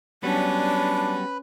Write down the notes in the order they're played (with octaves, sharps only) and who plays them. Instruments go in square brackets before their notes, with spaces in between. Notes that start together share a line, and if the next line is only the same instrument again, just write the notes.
[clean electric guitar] F#3 G3 B3 [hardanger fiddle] C#4 [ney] D4 [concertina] B4 B5